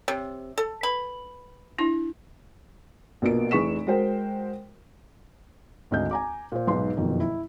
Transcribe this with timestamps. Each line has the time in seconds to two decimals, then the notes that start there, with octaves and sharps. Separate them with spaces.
0.08 C3 C#5
0.58 A4
0.83 B4 B5
1.78 D4 E4
3.22 A#1 B2 A#3 D7
3.51 F1 E3 G#4 C#6 B6 E7
3.87 G#3 F#4 A#4 C5 G5
5.91 G#1 D2 D#5 G6
6.11 G#5 A#5 D6
6.52 A#2 C5
6.67 B1 G#2 B4 C6
6.97 F#1 F2 B2 D#3
7.20 E4